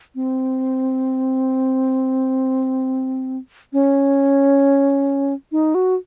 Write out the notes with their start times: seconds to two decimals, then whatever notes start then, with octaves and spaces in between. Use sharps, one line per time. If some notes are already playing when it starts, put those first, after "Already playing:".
0.15 C4
3.73 C#4
5.52 D#4
5.75 F#4